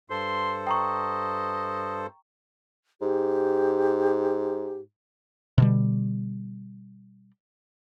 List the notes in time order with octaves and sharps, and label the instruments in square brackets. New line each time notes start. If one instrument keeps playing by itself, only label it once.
[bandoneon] G2 A4 C5 [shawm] C6
[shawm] D#5 [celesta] G5 A#5 C#6
[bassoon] G#2 [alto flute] G4
[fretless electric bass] B2 D3 G3